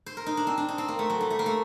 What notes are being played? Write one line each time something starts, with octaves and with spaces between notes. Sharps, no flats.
C5
A#4
D#4
D4
C4
D4
D#4
C4
A#3
A3
F#3
G3
A3
A#3
A3